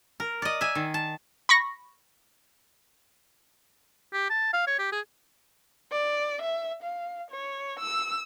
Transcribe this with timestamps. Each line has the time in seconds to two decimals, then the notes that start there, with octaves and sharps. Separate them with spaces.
0.20 A#4
0.42 D5 D#5
0.61 E5 G#5
0.75 D#3
0.94 A5
1.49 B5 C#6 A#6
4.13 G4
4.30 A5
4.53 F5
4.67 C#5
4.79 G4
4.92 G#4
5.92 D5
6.43 E5
6.83 F5
7.31 C#5
7.80 E6